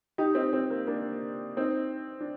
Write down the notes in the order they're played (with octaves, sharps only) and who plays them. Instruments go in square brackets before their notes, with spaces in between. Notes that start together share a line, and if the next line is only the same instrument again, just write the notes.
[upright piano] D#4 G4
C4 D#4
C4
A#3
A#3 D4
C4 D#4
D4